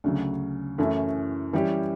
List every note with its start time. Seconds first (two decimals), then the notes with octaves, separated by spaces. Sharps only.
0.04 D2 C#3 F#3
0.78 F#2 E3 A3 C#4 E4
1.53 E3 G3 C#4 G4